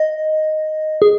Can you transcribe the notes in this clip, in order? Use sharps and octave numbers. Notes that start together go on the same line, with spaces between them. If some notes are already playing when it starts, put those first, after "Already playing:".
Already playing: D#5
G#4